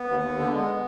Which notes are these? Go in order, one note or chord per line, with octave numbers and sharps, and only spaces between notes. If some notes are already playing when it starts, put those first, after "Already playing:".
Already playing: B3
D#2
D#2
D3
G#3 B3